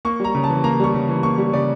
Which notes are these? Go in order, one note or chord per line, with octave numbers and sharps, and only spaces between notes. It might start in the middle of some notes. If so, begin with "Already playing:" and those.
A#3 C#6
G3 A#5
C#3
A5
E3
A#3 A#5
G3 C#6
C#3
E3
A#3 C#6
G3
C#3 D5